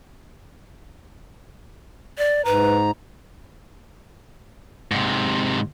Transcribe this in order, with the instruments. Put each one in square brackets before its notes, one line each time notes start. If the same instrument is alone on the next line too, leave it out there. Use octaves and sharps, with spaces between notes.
[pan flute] D5
[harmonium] G#2 A#5 [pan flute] B4
[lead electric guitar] G#2 C3